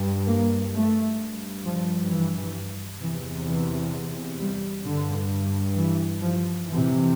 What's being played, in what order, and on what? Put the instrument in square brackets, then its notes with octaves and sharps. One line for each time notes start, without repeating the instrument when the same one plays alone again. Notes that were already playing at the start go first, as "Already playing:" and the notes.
Already playing: [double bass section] G2
A#3
A3
G2
F3
E3
E2 C3 E3
E3
G3
G2 D3
E3
F3
F2 C3 E3